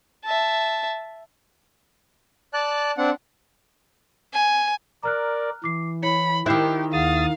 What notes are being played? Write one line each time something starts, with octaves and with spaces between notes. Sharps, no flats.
E5 A5
D5 A5 F#6
C4 D4 F#5
G#5
A#4 D5 A#5 F6 F#6
E3 D6 C7
E4 C#5 B5 C#7
D#3 E4 G4 F#6 G6 C7
D#2 G#4 F5 F#5 D#6 A6